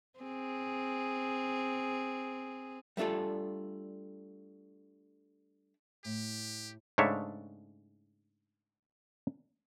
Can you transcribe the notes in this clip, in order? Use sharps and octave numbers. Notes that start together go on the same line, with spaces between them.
C4 G#4
G3 A3 D4 F4 A4
A2 G4
G#2 C#3 A3 D4 C#5 E5